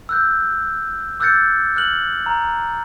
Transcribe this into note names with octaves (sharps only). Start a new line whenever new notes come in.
E6 F#6 G6
D6 E6 F#6 G6 A6 C#7
F6 F#6 F#7
A#5